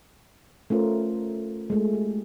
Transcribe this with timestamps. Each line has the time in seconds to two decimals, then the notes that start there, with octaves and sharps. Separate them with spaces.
0.70 A3 C#4 F4 A#4 C5
1.70 G#3 A3
1.94 G4